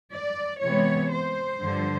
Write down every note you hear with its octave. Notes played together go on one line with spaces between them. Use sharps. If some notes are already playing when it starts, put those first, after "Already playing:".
D5
C3 E3 G#3 B3 C#5
C5
G2 D3 F3